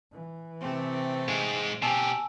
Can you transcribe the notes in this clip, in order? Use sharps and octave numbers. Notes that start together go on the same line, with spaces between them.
E3
C3 A3 C4
G#2 G#3 D7
B2 G4 G#5 A5 E6